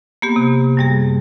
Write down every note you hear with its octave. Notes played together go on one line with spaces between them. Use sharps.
A#3 B3 G4
C3
F#2 G3 G#4